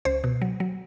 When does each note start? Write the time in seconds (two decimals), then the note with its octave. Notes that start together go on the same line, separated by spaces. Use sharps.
0.05 C#2 C5
0.24 B2
0.42 F#3
0.60 F#3